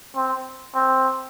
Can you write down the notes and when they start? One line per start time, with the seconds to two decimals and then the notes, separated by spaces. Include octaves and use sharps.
0.16 C4
0.74 C4